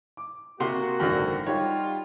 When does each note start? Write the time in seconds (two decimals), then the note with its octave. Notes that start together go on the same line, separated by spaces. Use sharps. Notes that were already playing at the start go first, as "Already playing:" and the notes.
0.17 D6
0.60 C3 A#3 F#4 F#5 C6
1.00 G#1 F#2 D3 G5
1.46 G3 D#4 F4 G4 C#5 F#5